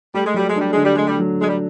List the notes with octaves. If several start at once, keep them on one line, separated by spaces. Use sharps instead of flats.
G3 A3
G#3
F#3 G3
G#3
G3 D4
D3 G#3
G3
G#3 A3
G3
F#3
G#3 D4
G3